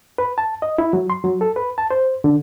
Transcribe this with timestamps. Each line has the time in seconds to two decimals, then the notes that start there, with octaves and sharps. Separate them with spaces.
0.18 B4
0.38 A5
0.62 D#5
0.78 E4
0.93 F#3
1.10 C6
1.24 F#3
1.41 A4
1.56 B4
1.78 A5
1.91 C5
2.24 D3